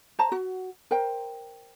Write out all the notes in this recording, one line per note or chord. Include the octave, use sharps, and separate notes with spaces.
C5 A5 A#5
F#4
A#4 C5 G5